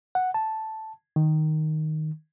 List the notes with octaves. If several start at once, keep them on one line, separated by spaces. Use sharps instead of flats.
F#5
A5
D#3